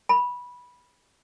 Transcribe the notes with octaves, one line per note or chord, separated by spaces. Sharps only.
B5